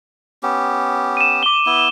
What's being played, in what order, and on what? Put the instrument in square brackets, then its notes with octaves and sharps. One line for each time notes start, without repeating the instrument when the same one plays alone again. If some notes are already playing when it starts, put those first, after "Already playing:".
[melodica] B3 C#4 G4
[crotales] D#7 E7
D6 G7
[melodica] B3 E4